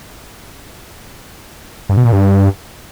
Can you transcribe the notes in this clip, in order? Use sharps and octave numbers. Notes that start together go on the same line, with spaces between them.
G2
B2
A#2
G2